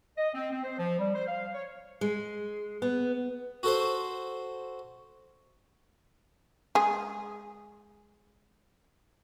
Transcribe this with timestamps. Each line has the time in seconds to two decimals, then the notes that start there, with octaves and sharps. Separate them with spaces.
0.18 D#5
0.35 C4
0.52 C4
0.64 C5
0.79 F3
0.99 G3
1.15 C5
1.27 F5
1.54 C#5
2.01 G#3
2.82 B3
3.63 F#4 A4 C5
6.75 G#3 G#4